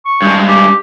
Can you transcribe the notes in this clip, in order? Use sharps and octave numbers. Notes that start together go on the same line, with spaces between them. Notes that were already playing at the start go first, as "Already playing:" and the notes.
C#6
G2 G#3
G4